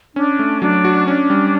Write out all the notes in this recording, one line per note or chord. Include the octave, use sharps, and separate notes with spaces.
C#4 D4
A3
F#3 D4
F#4
C#4 D4
G3